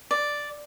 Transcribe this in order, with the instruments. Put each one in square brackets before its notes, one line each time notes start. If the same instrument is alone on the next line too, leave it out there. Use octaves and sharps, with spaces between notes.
[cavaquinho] D5